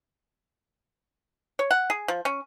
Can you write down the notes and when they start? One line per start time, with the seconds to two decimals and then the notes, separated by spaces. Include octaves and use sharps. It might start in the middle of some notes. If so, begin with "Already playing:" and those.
1.59 C#5
1.71 F#5
1.90 G#4
2.08 F3
2.25 C#4